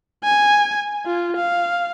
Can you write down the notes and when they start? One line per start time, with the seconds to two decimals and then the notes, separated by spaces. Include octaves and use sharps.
0.24 G#5
1.06 F4
1.37 F5